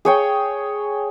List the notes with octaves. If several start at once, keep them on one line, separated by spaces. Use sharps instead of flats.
G#4 C#5 G5